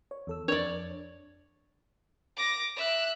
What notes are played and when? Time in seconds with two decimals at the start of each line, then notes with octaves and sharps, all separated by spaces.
0.11 C#5
0.27 E2 A4 E6
0.48 F2 D4 C#5 D5
2.37 D6 A#6
2.77 E5 F#6